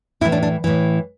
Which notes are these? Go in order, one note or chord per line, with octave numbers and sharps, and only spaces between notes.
A2 E3 E4
D4
D4
A2 E3